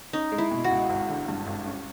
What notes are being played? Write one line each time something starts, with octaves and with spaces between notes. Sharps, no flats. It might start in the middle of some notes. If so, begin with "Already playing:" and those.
C#4 D#4
G#3
E4
B2
F#4
C#2
G#1
D3
G2
G#1
C#4